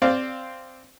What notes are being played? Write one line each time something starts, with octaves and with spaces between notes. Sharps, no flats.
C4 C5 D5 F5